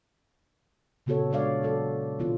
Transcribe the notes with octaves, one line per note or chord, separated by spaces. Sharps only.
A#2 C#3 B3 F#4 A4 C#5
G3 G#3 D4 C#5 D5 F5
F#3 F#4 A4
B2 E3 G3 B3 C4 F4